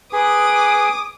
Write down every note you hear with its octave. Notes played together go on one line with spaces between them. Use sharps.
G#4 B4 D6 D#6